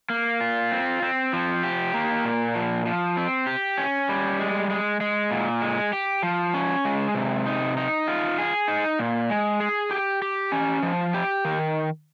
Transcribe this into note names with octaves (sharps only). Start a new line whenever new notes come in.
A#3
F4
C4
C4
F3
G4
A#3
A#2
F3
F3
C4
G4
C#4
G3
G#3
G#3
G#3
A#2
G#3
G4
F3
C#4
G#3
C3
D#4
D#4
F4
G#4
D#4
A#2
G#3
G#4
G4
G4
C#4
F3
G4
D#3